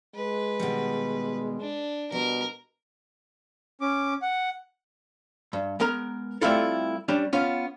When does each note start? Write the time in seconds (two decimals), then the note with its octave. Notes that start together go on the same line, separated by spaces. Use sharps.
0.15 G#3 B4
0.60 B2 D#3 G3
1.61 D4
2.12 B2 G3 A#4
3.81 C#4 D6
4.22 F#5
5.53 G2
5.80 G#3 B3 A#4 A#5
6.41 G3 A3 C4 E4 F4 A4
7.08 G3 C#4 D4
7.33 B3 C#4 F4